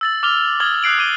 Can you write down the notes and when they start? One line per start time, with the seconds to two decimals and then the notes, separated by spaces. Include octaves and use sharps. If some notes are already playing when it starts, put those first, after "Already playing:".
0.01 E6 A6 F#7
0.23 D6 F6 F7 G7
0.60 D6 D#6 F6 G#6 F#7 G7
0.83 D#6 F#6 C7 D7 F#7
0.99 D6 D7 D#7 G7